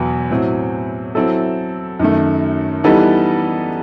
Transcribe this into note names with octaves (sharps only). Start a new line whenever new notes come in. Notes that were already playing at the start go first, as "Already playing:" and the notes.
Already playing: E2 B2 F#3 B3 E4
A2 F#3 C4
F#3 C4 E4 A4
F#2 D#3 A3
E3 G3 B3 D#4 A4